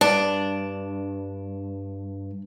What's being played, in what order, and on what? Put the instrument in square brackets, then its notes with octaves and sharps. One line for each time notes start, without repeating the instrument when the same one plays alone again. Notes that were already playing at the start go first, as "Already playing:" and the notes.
[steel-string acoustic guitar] G2 [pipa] D4